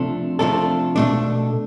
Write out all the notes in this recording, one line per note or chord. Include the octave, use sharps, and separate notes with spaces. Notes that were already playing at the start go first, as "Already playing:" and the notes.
Already playing: C3 F3 A3 D4 A4
C3 F3 A3 D4 A4
B2 A3 D4